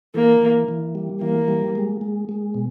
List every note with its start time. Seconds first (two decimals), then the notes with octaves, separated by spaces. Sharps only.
0.14 E3 A#3
0.41 E3
0.68 E3
0.95 G3
1.21 E3 A#3
1.48 G3
1.75 G#3
2.01 G#3
2.29 G#3
2.54 B2